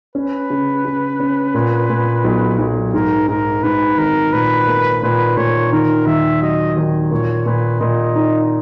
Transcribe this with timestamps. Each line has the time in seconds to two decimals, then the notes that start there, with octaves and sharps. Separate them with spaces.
0.15 C#4 B4
0.50 C#3
0.85 C#3
1.20 C#4
1.54 A#2
1.90 A#2
2.24 B1
2.59 B1
2.94 G#2 A#4
3.29 G#2 A#4
3.64 G#2 B4
3.98 G#1 A#4
4.33 A#2 B4
4.67 A#3
5.03 A#2 B4
5.37 A#2 C#5
5.72 D#3 A#4
6.07 D#2 E5
6.42 F#3 D#5
6.77 D#2
7.11 A#2 C#5
7.46 A#2 B4
7.81 A#2 D#5
8.16 D#4